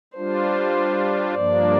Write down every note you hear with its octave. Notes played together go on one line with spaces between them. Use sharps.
G3 D4 F4 C5
G2 F3 A#3 D4 D5